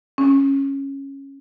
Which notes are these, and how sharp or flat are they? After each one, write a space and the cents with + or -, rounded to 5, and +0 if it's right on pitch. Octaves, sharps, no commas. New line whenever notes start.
C#4 -10